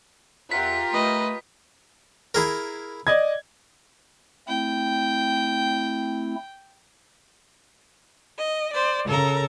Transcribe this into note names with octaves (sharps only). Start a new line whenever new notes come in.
E2 F4 G4 A#4 E5 F#5 B6
A3 B4 D#5
E4 G#4 A#4
D5 D#5 G#6
A3 C4 E4 G5
D#5
C5 D5
C#3 A4 A#4 A#5